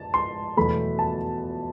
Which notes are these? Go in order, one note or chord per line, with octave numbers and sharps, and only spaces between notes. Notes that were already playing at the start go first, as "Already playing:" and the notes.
Already playing: A5
C6
E2 B2 F#3 A3 B5
A5